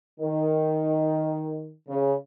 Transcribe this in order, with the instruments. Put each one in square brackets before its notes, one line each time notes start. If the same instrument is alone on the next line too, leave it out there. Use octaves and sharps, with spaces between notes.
[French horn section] D#3
C#3